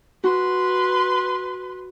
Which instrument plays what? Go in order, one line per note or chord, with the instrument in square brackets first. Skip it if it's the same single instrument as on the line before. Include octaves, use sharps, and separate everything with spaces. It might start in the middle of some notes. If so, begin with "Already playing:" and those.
[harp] F#4 [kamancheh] B4 C6